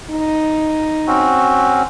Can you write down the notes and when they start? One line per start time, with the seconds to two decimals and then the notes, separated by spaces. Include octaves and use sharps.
0.10 D#4
1.07 C4 C#4 F#4